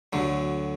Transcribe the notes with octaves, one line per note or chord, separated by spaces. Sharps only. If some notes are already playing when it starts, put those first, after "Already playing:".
D2 D3 F#3